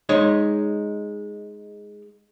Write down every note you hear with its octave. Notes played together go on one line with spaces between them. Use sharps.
G#3 D#4 C#5